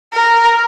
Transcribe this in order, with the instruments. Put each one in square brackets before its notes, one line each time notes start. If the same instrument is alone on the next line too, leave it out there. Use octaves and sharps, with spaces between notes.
[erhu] A#4